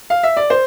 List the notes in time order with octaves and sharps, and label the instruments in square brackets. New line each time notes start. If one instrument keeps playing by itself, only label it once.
[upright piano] F5
E5
D5
C5